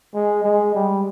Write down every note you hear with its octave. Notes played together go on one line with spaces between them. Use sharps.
G#3
G#3
G3